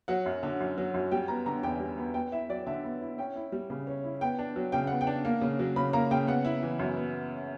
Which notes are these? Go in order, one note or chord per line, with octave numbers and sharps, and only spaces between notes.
F#3 F#5
F#2
D3
F#2
F#3
F#2
G3 G5
B3 A#5
D3 A#5
E2 G5
G3
B3
B3 G5
E4 E5
F#3 D5
D3 E5
B3
E4
C#4 G5
E4
G3
C#3
C#4
E4
B3 G5
D4
F#3
C#3 G5
B3 F#5
G5
D4
A#3
C#3
F#3
C#3 B5
A#3 A#5
C#3 G5
B3 F#5
E4
E3
F#2
B3